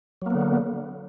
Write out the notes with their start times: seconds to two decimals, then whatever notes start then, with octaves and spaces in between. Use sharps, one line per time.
0.22 F#3
0.26 A#3
0.30 B3
0.35 D3